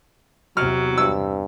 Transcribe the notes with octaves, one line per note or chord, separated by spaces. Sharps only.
E2 C3 F#3 F6
G2 E6